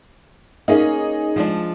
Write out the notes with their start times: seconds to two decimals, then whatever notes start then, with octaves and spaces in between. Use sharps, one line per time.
0.68 A#3 C#4 D#4 G#4
1.36 F3 G#3 D4